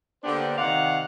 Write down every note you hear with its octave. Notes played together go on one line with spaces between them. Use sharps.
D3 A#3 B3 D4 G4 C5
C3 D#3 D5 F5 F#5